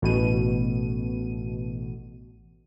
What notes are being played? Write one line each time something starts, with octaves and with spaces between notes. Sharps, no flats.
A1 B2 D#7